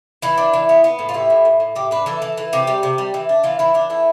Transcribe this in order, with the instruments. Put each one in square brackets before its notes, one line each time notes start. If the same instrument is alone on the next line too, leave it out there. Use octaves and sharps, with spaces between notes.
[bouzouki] E3 E4
D4
E3
B3
B3
A2
F4
G3 E4
A2
A2
A2
A2 G4
D4 B4
E3 A4
E3
E3
C3 G4
G3
C3
G3
E3
D4
E3 F4
E3 E4
E3 D4
A3 E4